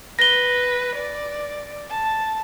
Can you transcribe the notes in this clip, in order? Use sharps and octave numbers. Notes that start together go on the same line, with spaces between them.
B4 A#6 G7
D5
A5